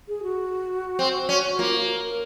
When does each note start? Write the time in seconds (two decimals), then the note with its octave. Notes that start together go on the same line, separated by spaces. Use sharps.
0.08 G#4
0.23 F#4
0.99 C4
1.29 C#4
1.59 A#3 F4
2.04 A#4